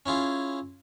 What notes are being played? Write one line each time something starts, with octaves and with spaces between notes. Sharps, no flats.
C#4 E4 F4 G#4